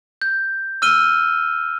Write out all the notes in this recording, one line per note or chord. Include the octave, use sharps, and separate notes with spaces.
G6
E6 F6 D#7 G7